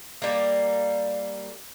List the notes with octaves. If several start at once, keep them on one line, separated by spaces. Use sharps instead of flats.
G3 A#3